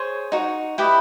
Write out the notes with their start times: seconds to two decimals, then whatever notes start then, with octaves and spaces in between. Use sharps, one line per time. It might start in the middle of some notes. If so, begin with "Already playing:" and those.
Already playing: G#4 C5 C#5 C6
0.32 D#4 F#4
0.78 E4 G4 B4 D#5